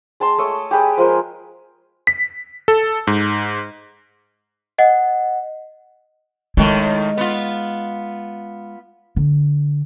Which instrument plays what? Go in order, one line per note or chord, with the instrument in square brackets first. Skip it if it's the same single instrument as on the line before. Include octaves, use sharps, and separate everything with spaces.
[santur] G#3 A5 C6
A3 C#5 D#5
G4 G#4 B4 D#5
F3 G#3 A#4 C5
[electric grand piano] B6
A4
G#2
[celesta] D#5 F#5
[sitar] A2 D#3 [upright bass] G#3
[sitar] B3 F4
[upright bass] D3